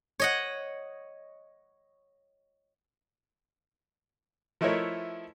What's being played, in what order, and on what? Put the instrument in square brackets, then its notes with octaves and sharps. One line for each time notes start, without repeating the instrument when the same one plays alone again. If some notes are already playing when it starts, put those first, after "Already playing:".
[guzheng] C#5 D#5 F#5
[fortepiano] F3 A3 E4 A#4 C#5 D#5